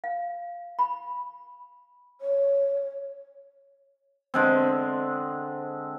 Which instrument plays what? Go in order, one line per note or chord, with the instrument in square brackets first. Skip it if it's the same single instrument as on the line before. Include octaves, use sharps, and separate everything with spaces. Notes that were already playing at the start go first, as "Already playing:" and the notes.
[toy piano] F5
B5
[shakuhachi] C#5
[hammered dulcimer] D3 G#3 C4